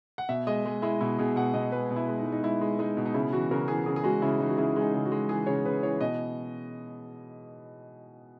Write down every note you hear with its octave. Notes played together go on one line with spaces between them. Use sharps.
F#5
B2 E5
G#3 D#5
G#3
G#3 E4
B2 E4
B2 G#4
B2 F#5
B2 D#5
G#3 B4
B2
E4
G#3
D#4
G#3
D#4
G#3 E4
G#3
G#3 D#4
B2
D#4
C#3 E4
E3 F#4
C#3 A#4
E3 G#4
C#3 G#4
G#4
G#3 F#4
C#3 E4
E3 D#4
F#4
C#3 E4
G#3
D#4
C#3
F#4
G#3
E3 G#4
C#3 C#5
C#3 B4
E3 C#5
B2 D#5